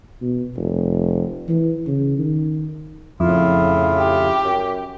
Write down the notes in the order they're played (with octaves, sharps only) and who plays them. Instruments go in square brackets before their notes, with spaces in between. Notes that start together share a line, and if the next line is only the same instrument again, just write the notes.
[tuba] B2
F1
E3
C#3
D#3
[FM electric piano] F2 [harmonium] A2 C#3 F4 [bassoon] E4
[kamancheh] G4
[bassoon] F#2